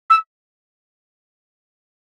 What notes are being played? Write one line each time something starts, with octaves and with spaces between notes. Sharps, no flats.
E6